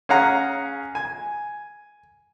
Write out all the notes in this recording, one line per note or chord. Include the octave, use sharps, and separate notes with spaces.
C#4 G#4 F5 F#5 A#5
G#5